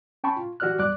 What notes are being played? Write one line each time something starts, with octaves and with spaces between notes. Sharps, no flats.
C#4 G5 A5 B5 C#6
F4
E3 F#4 G4 D5 F6 F#6
E2 G3 D5 D6 F#6